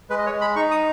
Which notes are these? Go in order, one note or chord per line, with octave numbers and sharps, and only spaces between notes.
G#3 B4
D#5
C#5
G#3
B5
D#4 C#6
D#6